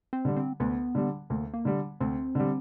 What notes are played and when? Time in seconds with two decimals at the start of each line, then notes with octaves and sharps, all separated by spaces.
0.13 C4
0.25 D3 G3
0.36 C4
0.60 D2 B3
0.95 D3 G3
1.30 D2 A#3
1.54 A#3
1.65 D3 G3
2.00 D2 C4
2.35 D3 G3